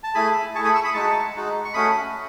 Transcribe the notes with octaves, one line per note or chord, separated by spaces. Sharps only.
A5
A3 E4 G#4 G#5 B5
A3 E4 G#4 A5 C#6
B5 D#6
C#6 E6
B5 D#6
G#3 D#4 F#4 A5 C#6
G#3 D#4 F#4
C#6
A3 C#4 F#4 B5 D#6